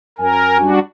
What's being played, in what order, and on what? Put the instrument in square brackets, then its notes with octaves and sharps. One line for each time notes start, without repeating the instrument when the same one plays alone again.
[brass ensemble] F#2 G#5 [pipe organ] A#4
[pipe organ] G3 D4 F#4